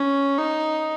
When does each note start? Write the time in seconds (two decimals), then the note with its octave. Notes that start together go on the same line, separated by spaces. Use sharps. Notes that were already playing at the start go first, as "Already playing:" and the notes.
Already playing: C#4
0.38 D#4